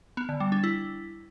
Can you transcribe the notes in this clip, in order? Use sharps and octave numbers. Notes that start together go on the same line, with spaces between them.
B3
D3
G3
D4
E4